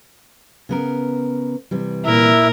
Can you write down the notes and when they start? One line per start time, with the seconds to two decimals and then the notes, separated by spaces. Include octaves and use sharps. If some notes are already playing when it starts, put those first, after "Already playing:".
0.69 C#3 B3 A#4
1.71 C3 E3 G3
2.05 A#2 E4 A#4 E5